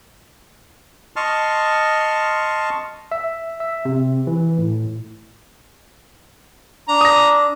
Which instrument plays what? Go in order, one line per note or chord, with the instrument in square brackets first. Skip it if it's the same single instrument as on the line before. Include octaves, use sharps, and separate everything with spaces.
[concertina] D#5 A5 C6 C#6 F6
[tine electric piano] E5
E5
C3
E3
A2
[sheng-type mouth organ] D4 [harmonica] A#5
[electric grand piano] D#6 A#6